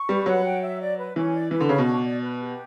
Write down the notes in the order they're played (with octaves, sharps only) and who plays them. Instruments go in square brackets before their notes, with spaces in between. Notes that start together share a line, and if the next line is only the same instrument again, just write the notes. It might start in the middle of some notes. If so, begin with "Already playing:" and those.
Already playing: [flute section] C#6
[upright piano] G3 [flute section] B4
[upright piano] F#3 [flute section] F#5
[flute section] G5
E5
D5
B4
[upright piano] E3 [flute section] C#4
[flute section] D5
[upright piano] E3 [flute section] B4
[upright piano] D3
[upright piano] C#3 [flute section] C#6
[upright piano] B2
[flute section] D4
D5
B4
G4